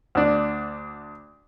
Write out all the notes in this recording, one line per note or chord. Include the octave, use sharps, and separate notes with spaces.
D2 D4